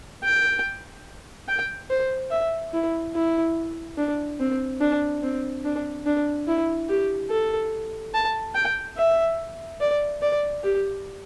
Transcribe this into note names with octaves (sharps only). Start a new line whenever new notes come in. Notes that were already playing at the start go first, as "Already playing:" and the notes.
G5
G5
C5
E5
E4
E4
D4
C4
D4
C4
D4
D4
E4
G4
A4
A5
G5
E5
D5
D5
G4